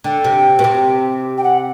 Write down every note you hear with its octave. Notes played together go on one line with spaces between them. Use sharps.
D3 G5
C3
B2
C3
G5
F#5